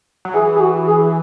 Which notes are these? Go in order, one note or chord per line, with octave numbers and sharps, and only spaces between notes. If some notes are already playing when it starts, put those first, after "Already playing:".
F#3
E3 G#4
G#4
F#4
G#4